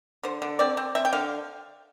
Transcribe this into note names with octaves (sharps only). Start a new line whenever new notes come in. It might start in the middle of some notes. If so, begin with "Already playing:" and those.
D3 C5
D3
C4 D5
C4
C4 E5
G5
D3 F5